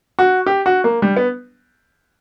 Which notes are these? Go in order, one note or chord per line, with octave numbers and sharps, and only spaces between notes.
F#4
G4
F#4
A#3
G3
B3